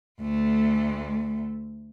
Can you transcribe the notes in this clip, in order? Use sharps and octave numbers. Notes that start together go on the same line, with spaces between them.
D2 A3